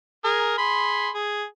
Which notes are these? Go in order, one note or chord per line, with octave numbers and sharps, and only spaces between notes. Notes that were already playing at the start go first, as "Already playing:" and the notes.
G#4 A#4
G#4 B5 C6
G#4